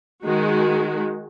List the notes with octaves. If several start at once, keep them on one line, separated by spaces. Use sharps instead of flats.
D#3 G#3 F#4